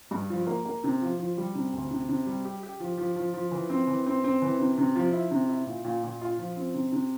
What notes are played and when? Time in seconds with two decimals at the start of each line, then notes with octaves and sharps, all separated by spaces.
0.11 G2
0.30 F3
0.47 A#3
0.65 A#3
0.84 C3
1.02 F3
1.19 F3
1.37 G3
1.55 C3
1.73 D2
1.91 C3
2.09 C3
2.26 G3
2.45 G4
2.63 G4
2.80 F3
2.98 F3
3.16 F3
3.33 F3
3.51 E3
3.69 C4
3.87 E3
4.06 C4
4.24 C4
4.42 E3
4.59 C3
4.78 C3
4.95 F3
5.13 E4
5.31 C3
5.49 E4
5.66 A#2
5.84 A#2
6.03 A#2
6.21 F4
6.38 F3
6.56 C4
6.74 C3
6.92 C3